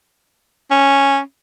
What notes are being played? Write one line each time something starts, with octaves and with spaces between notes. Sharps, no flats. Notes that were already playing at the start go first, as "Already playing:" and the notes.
C#4